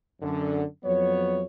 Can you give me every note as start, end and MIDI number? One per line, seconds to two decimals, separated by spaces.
0.21 0.63 42
0.21 0.63 50
0.84 1.43 41
0.84 1.43 54
0.84 1.43 59
0.84 1.43 73